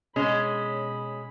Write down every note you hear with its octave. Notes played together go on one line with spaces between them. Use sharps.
B2 G#3 C#4 C#5 B5